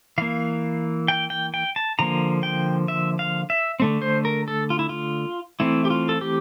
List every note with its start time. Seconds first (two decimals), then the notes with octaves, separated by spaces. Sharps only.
0.18 E3 A#3 F5
1.08 G5
1.30 G5
1.54 G5
1.76 A5
1.99 D3 F3 A#3 A#5
2.43 G5
2.88 E5
3.19 F5
3.50 E5
3.80 D3 A3 C4
4.02 C5
4.25 A#4
4.48 A4
4.70 F4
4.79 E4
4.89 F4
5.60 E3 A3 C4 E4
5.85 G4
5.90 F4
6.09 A4
6.21 G4